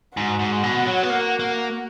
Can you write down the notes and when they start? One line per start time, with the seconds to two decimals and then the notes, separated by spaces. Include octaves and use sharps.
0.16 G#2 F#4
0.39 G#2
0.64 B2
0.87 F#3
1.03 B3
1.10 A#3
1.40 A#3